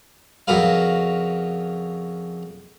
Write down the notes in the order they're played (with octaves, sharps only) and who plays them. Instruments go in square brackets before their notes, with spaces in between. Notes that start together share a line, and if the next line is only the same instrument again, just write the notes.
[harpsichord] F2 C#3 F#4 A#4 B4 F5